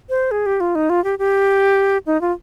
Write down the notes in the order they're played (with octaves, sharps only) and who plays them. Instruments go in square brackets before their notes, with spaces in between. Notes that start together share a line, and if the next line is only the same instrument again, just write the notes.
[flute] C5
G#4
G4
F4
D#4
F4
G4
G4
D#4
F4